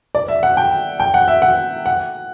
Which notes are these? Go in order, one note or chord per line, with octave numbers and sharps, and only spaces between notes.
D5
E5
F#5
G5
G5
F#5
E5
F#5
F#5